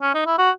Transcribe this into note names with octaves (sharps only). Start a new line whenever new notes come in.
C#4
D#4
E4
F#4